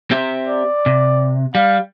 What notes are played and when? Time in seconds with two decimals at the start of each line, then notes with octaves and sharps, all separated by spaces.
0.11 C4 G4 E5
0.47 D5
0.86 C3
1.55 G3 F5